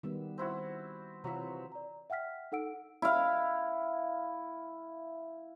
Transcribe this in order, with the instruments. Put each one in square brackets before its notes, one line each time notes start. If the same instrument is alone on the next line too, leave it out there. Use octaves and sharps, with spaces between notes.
[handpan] D#3 G3 B3 [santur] E5
[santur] C4 E4 F#4
[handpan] C3 E3 F4 [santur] F#3 E5
[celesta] D5 A#5
E5 F#5 G5 F6 B6
D#4 A4 F#5 E6 D7
[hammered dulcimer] E4 F5